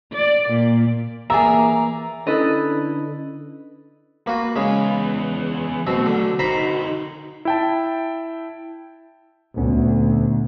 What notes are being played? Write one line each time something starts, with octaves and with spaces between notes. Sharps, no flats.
D5
A#2
E3 A#3 G#4 D5 E5 A#5
D3 C#4 E4 A4 B4 D#5
A#3 F#4 B4
E2 C#3 G#3 B4
B2 F#3 A3 C4 F#4
D3
D3 D#4 C5 A#5 B5
E4 G5 A5
D2 A#2 B3 C#4